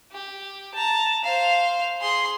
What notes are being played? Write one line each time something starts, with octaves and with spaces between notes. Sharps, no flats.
G4
A5 A#5
C5 F5
G#4 C6